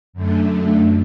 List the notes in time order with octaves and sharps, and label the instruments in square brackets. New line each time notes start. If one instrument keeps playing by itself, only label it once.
[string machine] F#2 D3 A3